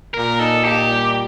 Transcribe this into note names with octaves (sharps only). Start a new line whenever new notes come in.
A#2 A#4
D#4 A4
A#2 G4
G3